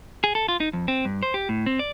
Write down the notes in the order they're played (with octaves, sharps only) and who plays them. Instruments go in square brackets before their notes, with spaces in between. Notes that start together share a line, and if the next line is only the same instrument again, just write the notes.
[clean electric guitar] G#4
A4
F4
D#4
F2
C4
G2
C5
G4
A2
C4
D5